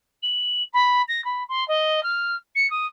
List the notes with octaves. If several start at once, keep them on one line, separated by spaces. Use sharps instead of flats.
F#7
B5
A#6
B5
C6
D#5
F6
C#7
D#6